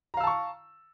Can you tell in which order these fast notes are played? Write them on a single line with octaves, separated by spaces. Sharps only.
A#5 F5 E6 A5 C#6